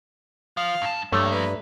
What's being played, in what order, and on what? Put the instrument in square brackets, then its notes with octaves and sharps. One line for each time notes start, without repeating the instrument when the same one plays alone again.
[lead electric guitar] F3 [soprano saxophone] F5
[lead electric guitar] G2 A5
[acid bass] G2 [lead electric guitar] F3 A#3 [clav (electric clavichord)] A3 [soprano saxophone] C#5
[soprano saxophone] B4